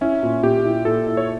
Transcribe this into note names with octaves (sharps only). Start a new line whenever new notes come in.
C#4 E4
A#2
A#2 G4
E4
A#2 A4
E4
C#5